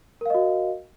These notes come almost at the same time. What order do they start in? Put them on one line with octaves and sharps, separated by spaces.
A#4 F5 D#5 F#4